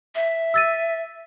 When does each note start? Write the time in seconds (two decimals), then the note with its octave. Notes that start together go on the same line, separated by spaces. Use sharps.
0.15 E5
0.54 E6 A6 D#7